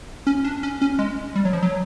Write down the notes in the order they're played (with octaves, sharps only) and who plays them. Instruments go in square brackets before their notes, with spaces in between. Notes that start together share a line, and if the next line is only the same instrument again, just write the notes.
[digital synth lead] C#4
D4
C#4
C#4
G#3
G3
F#3
F3
F#3